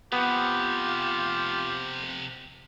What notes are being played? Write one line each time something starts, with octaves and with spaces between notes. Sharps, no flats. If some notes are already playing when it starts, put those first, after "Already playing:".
C3 F3 B3 F4 G4